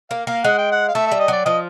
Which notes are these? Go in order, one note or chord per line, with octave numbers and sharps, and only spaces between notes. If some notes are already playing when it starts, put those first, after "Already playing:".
A#3 F5
A#3 F5
G#3 F#5
G5
F#5
F5
A3 E5
E5
G3
D#5
F#3 D5
F3 D#5